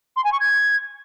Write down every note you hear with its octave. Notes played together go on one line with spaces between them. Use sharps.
C6
G#5
C#6
G#6